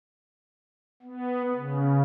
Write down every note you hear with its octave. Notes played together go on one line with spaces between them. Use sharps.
B3
C#3